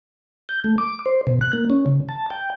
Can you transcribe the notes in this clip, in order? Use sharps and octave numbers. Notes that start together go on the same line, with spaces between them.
G6
A3
D6
C5
B2
F#6
A#3
C#4
C#3
A5
G5